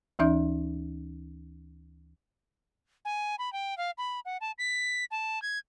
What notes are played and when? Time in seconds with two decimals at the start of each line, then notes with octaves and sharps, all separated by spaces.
0.19 D2 E3 C#4 D#4 E5 G6
3.05 G#5
3.39 B5
3.53 G5
3.77 F5
3.98 B5
4.25 F#5
4.41 A5
4.58 B6
5.11 A5
5.42 G#6